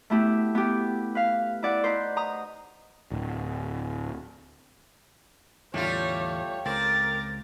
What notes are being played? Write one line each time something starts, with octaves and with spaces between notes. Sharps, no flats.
A3 B3 E4 G4
B3 G4
B4 F5
E4 D5 F#5
D#4 B4 C5
A#5 D#6
D1
E2 A2 D3 G3 A3 F4 C#5
C#2 C4 A#4 D6 A6